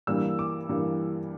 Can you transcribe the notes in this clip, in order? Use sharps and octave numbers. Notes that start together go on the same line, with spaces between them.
G2 E3 G3 A#3 E6
D6
G2 E3 G3 A#3